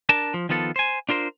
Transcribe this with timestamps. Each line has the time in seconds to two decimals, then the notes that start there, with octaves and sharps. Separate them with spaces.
0.09 D4 A#4 A5
0.34 F3
0.49 D#3 F3 B3 F4 A4
0.76 C5 G#5
1.09 D4 F4 A#4 C5